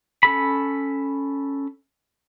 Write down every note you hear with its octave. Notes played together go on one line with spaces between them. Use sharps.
C#4 A4 B5